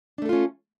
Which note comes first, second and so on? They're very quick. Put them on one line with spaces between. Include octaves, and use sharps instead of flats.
D4 A3 A4 F4 C#4